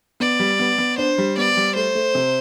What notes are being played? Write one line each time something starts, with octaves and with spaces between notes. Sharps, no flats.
B3 D5
G3
B3
B3
D4 C5
G3
B3 D5
G3
A3 C5
A3
C3